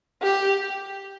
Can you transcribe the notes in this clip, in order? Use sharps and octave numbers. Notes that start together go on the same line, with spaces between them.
G4